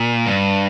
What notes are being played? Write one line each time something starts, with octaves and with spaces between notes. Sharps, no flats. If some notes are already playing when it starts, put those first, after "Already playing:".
Already playing: A#2
G2